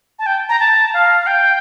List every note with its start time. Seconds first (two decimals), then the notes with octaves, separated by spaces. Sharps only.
0.19 A5
0.26 G5
0.49 A#5
0.60 A5
0.94 F5
1.27 G5